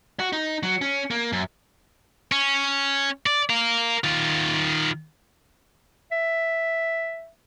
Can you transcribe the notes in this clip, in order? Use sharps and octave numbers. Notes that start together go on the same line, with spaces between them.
F#4
D#4
F#3
C#4
A#3
F#2
C#4
D5
A#4 F5
D#3 F4
E5